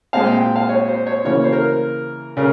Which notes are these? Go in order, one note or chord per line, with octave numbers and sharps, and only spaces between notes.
A#2 G#3 C4 F5
G5
G5
F5
C#5
C5
C#5
C#3 E3 A#3 C#5
C5
A#4
C#3 A#4